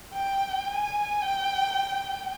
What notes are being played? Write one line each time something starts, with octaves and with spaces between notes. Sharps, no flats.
G5
G#5
G5